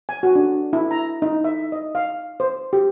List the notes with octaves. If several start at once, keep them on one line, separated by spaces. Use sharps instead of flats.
G#5
F#4
D4
E4
A#5
D#4
E5
D#5
F5
C5
G4